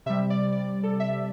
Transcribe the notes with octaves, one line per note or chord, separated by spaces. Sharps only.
C3 G3 E5
D5
D5
A4
E5